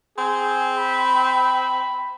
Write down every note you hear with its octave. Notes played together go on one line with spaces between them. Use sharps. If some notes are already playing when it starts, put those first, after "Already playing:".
C4 G#4
B5